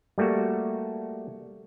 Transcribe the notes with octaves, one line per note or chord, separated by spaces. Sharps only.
G3 A3 A#3 F#4